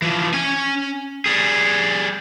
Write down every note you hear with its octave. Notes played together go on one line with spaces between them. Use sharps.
E3 F3
C#4 G#5
G3 G#4